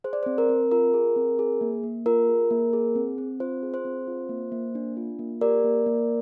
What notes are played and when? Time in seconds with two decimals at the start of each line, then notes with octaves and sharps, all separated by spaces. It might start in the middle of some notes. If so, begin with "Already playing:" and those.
0.04 G#4 C5
0.13 D5
0.23 C4 C5
0.38 A#4
0.49 C4
0.71 F4 A#4
0.94 G#4
1.16 C4
1.39 G#4
1.61 A#3
1.83 A#3
2.06 F4 A#4
2.28 G#4
2.51 A#3
2.73 G#4
2.95 C4
3.18 C4
3.40 F4 C5
3.63 G#4
3.74 C5
3.85 C4
4.07 F4
4.29 A#3
4.52 A#3
4.75 D4
4.97 F4
5.19 A#3
5.41 G4 A#4 D5
5.64 A#3
5.86 A#3